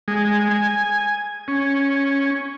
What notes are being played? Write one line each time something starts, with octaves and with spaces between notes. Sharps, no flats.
G#3
G#5
C#4